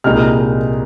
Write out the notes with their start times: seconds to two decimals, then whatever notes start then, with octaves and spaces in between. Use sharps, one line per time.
0.04 C2 A#2 G#3 D#4 F6